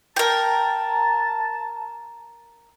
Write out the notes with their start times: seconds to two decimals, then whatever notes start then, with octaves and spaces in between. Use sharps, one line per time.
0.16 A#4 G5 A5